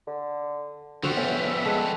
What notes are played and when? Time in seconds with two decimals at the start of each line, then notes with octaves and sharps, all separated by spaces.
0.07 D3
1.03 D3 F3 G3 F#4 C5 F#5 E6
1.17 A2 B3 C#4 E5
1.66 G#3 A4 C#5 F#5